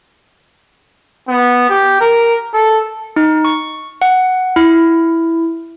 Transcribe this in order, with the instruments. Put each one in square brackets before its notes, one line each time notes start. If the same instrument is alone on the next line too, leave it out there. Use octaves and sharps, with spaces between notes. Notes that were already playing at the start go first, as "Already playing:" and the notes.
[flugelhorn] B3
G4
A#4
A4
[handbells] D#4
C#6
F#5
E4